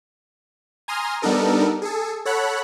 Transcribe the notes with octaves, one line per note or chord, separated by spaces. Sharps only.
G#5 A#5 C6 D#6 F6
G3 B3 D4 D#4 A4 A#4
G#4 A4
A4 C#5 F#5 B5 F#6